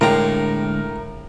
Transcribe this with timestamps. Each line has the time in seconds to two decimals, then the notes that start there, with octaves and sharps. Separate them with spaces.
0.01 A2 D3 G#3 A#3 D4 A#4 G5 A#5